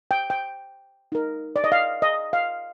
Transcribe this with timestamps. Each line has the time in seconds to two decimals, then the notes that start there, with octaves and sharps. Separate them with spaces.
0.11 G5
0.30 G5
1.12 D#4 A#4
1.56 D5
1.64 D#5
1.72 F5
2.02 D#5
2.33 F5